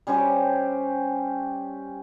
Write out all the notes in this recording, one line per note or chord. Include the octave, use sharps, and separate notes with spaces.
G3 C#4 G4 C5